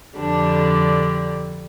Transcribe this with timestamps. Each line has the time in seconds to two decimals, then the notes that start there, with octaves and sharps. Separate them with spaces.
0.18 F2 D3 G3 D4